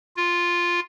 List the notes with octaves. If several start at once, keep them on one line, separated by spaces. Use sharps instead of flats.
F4